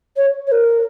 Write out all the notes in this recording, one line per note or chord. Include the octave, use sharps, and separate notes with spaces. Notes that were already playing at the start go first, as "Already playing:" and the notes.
C#5
C#5
A#4